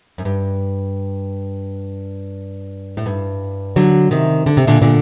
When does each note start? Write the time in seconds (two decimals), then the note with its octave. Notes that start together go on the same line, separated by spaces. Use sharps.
0.18 F#2
0.25 G2
2.97 A2
3.06 G2
3.76 D3 F#3
4.11 C3 D#3
4.46 D3
4.57 C3
4.67 A#2 D3
4.82 A#2 D3